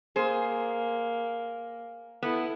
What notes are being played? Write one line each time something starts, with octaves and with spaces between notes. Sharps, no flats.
A#3 G#4 C5
B3 E4 A4